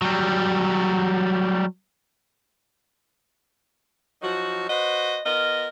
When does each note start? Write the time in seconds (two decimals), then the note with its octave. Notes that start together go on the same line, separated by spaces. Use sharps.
0.02 F#3 G3
4.22 F3 F#3 D#4 F#4
4.70 F#4 B4 C5 D#5
5.26 B3 F4 A#4 D#5